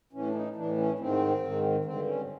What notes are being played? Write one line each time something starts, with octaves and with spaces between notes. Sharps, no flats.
A2 E3 C#4
D4
D#4
A2 E3 D4
C#4
G#2 D#3 C4
G#2 D#3
G2 D3 C4
C#4